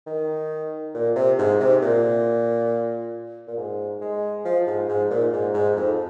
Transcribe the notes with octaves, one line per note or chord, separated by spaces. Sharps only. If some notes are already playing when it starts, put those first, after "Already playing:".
D#3
A#2
C3
G#2
C3
A#2
A#2
G#2
G#3
F3
G#2
G#2
A#2
G#2
G#2
F2